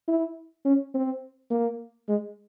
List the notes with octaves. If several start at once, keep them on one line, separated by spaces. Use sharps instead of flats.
E4
C#4
C4
A#3
G#3